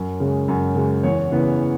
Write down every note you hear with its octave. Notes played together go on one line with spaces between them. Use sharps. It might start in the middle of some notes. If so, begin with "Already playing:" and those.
Already playing: F#2
C#3 G#3
F#2
C#3 G#3
E2 C#5
C#3 E3 B3